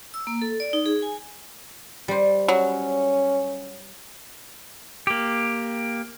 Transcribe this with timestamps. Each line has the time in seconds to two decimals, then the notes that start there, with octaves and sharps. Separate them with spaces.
0.14 E6
0.27 A#3
0.42 A4
0.60 D5
0.73 D#4
0.86 G#4
1.02 G#5
2.08 G3 C5
2.48 F#3 C#4
5.07 A#3 G4